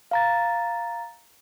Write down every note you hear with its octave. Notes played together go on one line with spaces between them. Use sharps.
F5 A#5 A6